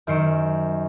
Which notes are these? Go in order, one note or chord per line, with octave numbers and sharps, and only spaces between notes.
F#2 D#3 C5 C#7 D7 E7